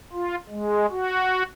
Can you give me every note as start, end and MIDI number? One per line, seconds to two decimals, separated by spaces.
0.13 0.35 65
0.49 0.86 56
0.91 1.43 66